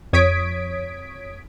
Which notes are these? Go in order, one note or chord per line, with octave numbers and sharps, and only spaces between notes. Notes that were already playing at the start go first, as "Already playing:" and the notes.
F2 C#5 D#6 G#6 B6 D7